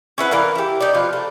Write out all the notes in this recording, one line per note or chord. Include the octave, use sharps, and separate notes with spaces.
C#4 E4 B4 F#5
E3 A#4 D5 F5
E4 G4
D#4 G4 D5
B2 F3 F4
A3